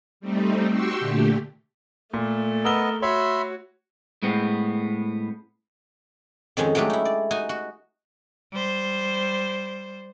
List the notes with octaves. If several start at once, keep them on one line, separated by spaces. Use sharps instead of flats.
G3 A3 C4 D#4
F#4 G4 G5 C6 C#6 E6
A#2 D3 A3 G4
A#2 A3 A4
B3 A#4 D#5 E6 G7
F#4 C#5 E5 B5 C6
A2 G#3 B3 C4
F2 D#3 G#3 C#4
F#3 G#3 A3 D4 G4
D#4 E4
D5
D#4 F#4 G#5
F#4
G3 C5